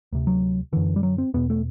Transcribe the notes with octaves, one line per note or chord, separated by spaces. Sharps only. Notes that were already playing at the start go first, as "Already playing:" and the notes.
D2 C3
F#3
F#2 D3 E3
G3
F#3
C4
E2 B2 B3
A3